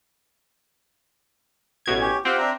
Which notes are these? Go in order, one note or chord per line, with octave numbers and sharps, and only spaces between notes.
A1 B2 G#6
C#4 G4
C4 F4 G4 F#5
D4 E5 A#5